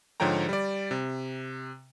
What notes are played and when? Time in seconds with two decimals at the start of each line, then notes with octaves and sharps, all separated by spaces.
0.20 G#2 D3 F3 C#5 G5 A#5
0.49 G3 D5
0.91 C3